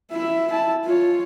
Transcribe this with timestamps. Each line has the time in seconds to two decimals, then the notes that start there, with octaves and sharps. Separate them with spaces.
0.11 E4 E5
0.51 E4 A5
0.85 F4 C#5